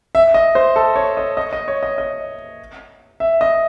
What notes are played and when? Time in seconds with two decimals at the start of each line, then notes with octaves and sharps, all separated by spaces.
0.15 E5
0.34 D#5
0.55 C5
0.76 A4
0.96 C#5
1.17 D#5
1.37 D#5
1.53 D#5
1.68 C#5
1.83 D#5
1.98 D#5
3.20 E5
3.41 D#5